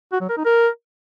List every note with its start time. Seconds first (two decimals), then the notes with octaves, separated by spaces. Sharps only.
0.13 F#4
0.21 F#3
0.29 A#4
0.37 D#4
0.45 A#4